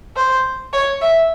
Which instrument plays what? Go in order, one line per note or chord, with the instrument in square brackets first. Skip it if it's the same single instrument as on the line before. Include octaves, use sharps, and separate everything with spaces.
[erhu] C5
C#5
E5